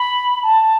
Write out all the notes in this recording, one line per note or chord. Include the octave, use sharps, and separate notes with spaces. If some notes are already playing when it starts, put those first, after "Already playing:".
Already playing: B5
A5